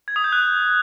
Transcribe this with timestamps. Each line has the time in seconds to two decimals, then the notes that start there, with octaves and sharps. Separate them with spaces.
0.08 G#6
0.16 D#6
0.24 G6
0.32 F#6